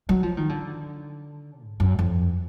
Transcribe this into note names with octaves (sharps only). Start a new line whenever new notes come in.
F#3
F3
D#3
D3
G#2
F#2
F2